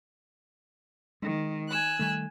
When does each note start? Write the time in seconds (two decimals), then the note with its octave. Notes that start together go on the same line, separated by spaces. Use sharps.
1.22 D#3 G#3
1.68 G#5 E6 F#6
1.99 D#3 G3 A3